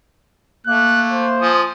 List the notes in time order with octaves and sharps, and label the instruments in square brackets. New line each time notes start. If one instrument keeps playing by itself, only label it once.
[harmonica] A3 [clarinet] A#3 [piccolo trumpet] F#6
[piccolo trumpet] C5
[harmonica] F3 G#5 D#6